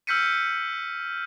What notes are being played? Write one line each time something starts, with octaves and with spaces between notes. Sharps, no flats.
E6 F6 G6 B6 C#7 D#7